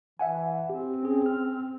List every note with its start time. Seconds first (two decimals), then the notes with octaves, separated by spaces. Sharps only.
0.19 E3 E5 F#5 G#5
0.70 C4 G4
1.03 C#4 G#4 G5
1.26 F6